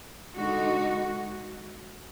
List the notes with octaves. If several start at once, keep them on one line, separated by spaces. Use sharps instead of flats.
D3 G#3 D#4 F#4